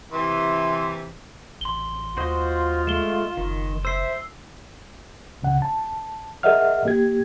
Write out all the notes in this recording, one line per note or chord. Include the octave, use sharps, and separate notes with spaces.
C3 E3 C6
A1 C6 G7
D#2 F4 F#4 C5 D#5
G#3 A3 E7 G7
F#1 D#3
C5 E5 E6 C7
C#2 C#3 F#5
A5
G#4 A#4 D#5 E5 F#5 F6
A#3 G4 G#6